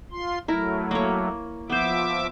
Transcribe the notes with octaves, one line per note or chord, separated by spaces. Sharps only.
F4 C6
F#3 A3 E4 A#4
A#3 C#5
F3 B3 C5 E5 D6